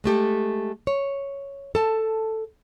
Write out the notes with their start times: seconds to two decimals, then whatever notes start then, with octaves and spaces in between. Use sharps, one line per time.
0.04 G#3 A3 G4 A4
0.87 C#5
1.75 A4 A5